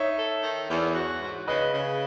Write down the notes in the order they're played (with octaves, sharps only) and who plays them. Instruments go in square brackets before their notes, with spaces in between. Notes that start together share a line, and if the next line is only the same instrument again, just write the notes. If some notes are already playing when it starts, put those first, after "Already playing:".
Already playing: [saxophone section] D#4 [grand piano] C#5 E5
[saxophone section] A4
D#3
E2
F#4
G#2
[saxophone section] C#3 [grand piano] B4 D#5
[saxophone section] C#3